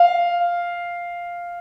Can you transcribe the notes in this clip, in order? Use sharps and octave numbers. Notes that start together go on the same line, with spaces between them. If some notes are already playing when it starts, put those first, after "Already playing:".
Already playing: F5